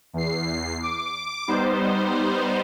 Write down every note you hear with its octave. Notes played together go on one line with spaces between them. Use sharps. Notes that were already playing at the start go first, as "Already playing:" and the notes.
E2 C7
D6
G3 B3 D#4 C5